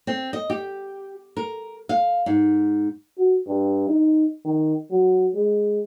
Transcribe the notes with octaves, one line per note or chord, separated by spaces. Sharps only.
C4
D#5
G4
A#4
F5
G#2
F#4
G2
D#4
D#3
F#3
G#3